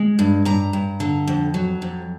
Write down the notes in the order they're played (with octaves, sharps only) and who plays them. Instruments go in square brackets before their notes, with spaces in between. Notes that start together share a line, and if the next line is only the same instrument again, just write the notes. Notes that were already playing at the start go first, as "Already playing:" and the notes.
Already playing: [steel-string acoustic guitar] G#3
G2
G2 A#5
G2
D3
F2
F#3
F2